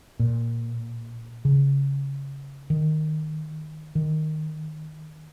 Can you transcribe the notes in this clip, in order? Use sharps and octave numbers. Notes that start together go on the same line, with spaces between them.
A#2
C#3
D#3
D#3